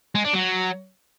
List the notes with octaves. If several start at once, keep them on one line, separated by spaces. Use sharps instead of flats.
G#3
D4
F#3